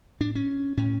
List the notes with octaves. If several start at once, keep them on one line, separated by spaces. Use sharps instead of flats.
A2 D4
C#4
A2 C#4